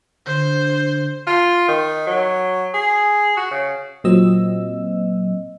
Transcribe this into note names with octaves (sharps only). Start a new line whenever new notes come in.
D3 C5
F4
D#3
F#3
G#4
F#4
C#3
A#2 F#3 C4 D#5 E6